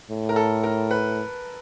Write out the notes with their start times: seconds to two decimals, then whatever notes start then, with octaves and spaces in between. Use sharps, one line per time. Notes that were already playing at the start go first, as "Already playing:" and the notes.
0.10 A2
0.29 A#4
0.36 A4
0.64 A#4
0.91 B4